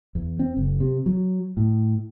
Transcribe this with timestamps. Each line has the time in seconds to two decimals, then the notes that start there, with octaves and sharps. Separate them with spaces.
0.15 E2
0.39 C4
0.57 F#1
0.80 C3
1.06 F#3
1.57 A2